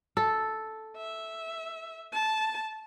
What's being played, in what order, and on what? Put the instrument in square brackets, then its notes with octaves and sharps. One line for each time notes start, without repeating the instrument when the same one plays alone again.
[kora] A4
[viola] E5
A5